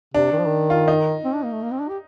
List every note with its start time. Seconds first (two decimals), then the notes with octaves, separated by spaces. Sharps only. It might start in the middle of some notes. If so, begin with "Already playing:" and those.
0.14 C3 D4
0.32 D#3
0.40 F3
0.47 D#3
0.70 F4
0.88 D#4
1.25 C4
1.34 D4
1.44 A#3
1.52 A3
1.62 A#3
1.71 C4
1.80 D4
1.89 G4